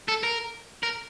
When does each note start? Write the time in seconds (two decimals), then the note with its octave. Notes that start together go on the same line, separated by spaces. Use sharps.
0.08 A4
0.23 A#4
0.83 A#4